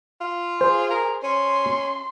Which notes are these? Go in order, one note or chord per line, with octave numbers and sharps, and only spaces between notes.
F4
G#4 C5
A#4
C#4 C6